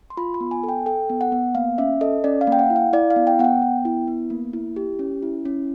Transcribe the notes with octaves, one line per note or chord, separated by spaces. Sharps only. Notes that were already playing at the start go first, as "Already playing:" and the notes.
C6
F4 B5
B5
B3
G#5
A4
G5
A4 G5
B3
F#5
B3
A#3 F5
C#4 E5
A4 D#5
C#4 D5
F5
A#3
G5
F#5
E4
F5
E4 D5
F5
B3
G5
B3 F#5
G5
B3
E4
B3
A#3
E4
G4
C#4
E4
C#4